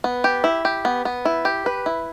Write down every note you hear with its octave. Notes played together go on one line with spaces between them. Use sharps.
B3
G4
E4
G4
B3
B3
E4
G4
B4
E4